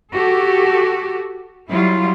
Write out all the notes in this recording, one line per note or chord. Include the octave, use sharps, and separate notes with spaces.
F#4 G4 A4
F#3 G3 E4 F4